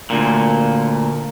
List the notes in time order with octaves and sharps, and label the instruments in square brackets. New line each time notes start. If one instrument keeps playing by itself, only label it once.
[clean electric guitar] D2 A#2